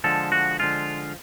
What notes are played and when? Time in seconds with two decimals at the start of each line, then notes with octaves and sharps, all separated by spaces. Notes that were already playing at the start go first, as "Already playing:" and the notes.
0.04 D3 F3 G#3 A4
0.32 F#4
0.59 D3 F3 G#3 F4